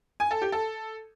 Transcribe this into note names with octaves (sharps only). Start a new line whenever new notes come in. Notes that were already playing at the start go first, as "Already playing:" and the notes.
G#5
A4
G4
A4